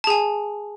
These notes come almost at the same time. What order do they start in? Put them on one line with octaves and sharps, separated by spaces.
A5 G#4 G#5